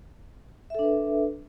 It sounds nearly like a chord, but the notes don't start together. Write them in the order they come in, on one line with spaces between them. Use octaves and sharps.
E5 A4 D4 B4